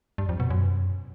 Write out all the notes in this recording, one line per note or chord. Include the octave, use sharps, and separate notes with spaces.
G2
F2
B2
F#2